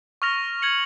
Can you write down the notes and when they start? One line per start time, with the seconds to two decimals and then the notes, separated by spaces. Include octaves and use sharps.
0.22 C#6 F6 A#6 F7
0.62 G#6 C#7 F#7